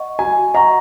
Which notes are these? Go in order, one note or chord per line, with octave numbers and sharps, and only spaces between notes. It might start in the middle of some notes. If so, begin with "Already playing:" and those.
Already playing: D#5 F#5 C#6
F#4 G#5
D#5 F#5 A#5 C#6